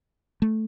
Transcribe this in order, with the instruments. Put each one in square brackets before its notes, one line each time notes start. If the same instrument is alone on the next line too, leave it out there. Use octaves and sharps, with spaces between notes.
[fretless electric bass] A3